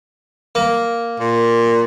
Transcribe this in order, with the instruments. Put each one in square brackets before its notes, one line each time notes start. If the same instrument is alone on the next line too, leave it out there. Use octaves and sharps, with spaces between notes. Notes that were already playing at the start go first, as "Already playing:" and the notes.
[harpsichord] A#3
[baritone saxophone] A#2